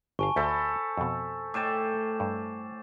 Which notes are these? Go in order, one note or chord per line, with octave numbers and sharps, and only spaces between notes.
G1 F5 G#5 A5 C#6
D2 A4 C5 B5
F2 B2
A2 G5 A5 D6 C7 E7
G2